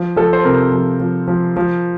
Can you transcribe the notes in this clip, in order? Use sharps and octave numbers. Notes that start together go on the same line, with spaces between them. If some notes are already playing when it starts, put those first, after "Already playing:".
Already playing: F3
F3 A4
C5
C3 A#4
F3
F3
F3
F3